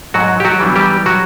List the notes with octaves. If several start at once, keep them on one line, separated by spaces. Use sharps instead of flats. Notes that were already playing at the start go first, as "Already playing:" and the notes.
G#2 F#3 F#4
G4
F#3 F#4
E3 G3 B3 D4
G3 G4
F#3 F#4